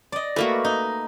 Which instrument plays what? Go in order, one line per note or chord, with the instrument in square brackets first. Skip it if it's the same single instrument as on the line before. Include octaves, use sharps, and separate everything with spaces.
[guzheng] D5 D#5
[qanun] A3 A#3 F#4 [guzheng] B4
[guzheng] D#4